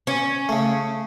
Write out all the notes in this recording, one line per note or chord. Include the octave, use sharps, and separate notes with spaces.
C#4
C#3 A3